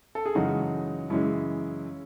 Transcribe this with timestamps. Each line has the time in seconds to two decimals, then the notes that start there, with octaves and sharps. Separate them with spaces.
0.15 A4
0.26 G#4
0.35 F#2 C#3 E3 G#3 D#4 F#4
1.10 F#2 C#3 E3 G#3 C#4 E4